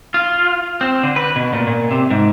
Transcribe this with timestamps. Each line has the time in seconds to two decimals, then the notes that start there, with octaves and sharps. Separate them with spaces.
0.14 F4
0.81 C4
1.03 D3
1.16 B4
1.36 B2
1.53 A#2
1.67 A#2
1.91 C3
2.11 G#2